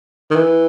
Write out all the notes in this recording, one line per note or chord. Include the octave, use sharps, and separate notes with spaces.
D#3
E3